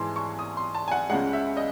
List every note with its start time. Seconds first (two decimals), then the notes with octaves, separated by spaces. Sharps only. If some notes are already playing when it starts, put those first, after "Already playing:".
Already playing: G#2 E3 G#3 A5 C6
0.16 C#6
0.39 D#6
0.57 C6
0.75 A5
0.88 G#5
0.92 F#5
1.10 C#2 C#3 G#3 F#5
1.33 E5
1.57 D#5